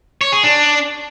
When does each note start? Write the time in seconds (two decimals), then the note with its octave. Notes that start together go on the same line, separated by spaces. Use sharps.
0.21 C#5
0.32 G#4
0.43 D4